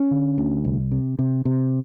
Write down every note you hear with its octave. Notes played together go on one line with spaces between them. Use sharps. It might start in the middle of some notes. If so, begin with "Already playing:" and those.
Already playing: C#4
D3
D2
C2
C3
C3
C3